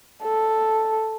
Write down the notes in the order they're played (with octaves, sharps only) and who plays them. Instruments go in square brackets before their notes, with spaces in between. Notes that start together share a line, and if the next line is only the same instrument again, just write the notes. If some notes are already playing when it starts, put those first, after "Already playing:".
[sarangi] A4